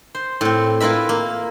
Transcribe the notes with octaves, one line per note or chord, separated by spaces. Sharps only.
C5
A2 C4
E4 F4 A#4 B4 E5
A#3